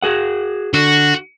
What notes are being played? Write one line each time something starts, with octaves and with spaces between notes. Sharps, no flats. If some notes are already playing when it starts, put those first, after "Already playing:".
F#4 G#4 F#5
D3 F#4